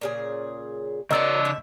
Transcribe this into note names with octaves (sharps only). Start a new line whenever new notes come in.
A#2 C#3 G#4
C#3 C#4 F#4 A#4 D5 D#5 E6
E5